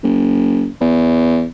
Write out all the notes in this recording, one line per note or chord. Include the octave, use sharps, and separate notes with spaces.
F#1
E2